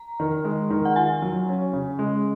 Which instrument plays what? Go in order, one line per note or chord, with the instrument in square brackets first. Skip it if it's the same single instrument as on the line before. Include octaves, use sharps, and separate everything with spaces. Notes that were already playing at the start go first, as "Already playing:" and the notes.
Already playing: [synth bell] A#5
[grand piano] D#3
G#3
D#3
[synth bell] F#5
[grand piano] F4 [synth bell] G#5
[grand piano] F#3
C#4
C#3
G#3